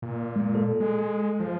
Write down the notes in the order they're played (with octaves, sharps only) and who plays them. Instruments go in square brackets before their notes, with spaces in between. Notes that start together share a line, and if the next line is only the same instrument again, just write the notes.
[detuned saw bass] A#2
[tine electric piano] G#3
A4
[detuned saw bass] G#3
F3